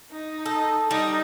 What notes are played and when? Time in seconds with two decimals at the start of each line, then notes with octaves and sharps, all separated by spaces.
0.11 D#4
0.46 A4
0.91 G3 D#4